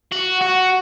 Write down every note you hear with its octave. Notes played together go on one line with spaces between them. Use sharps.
F#4
F#4